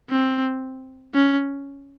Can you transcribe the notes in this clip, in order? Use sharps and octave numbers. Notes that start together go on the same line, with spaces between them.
C4
C#4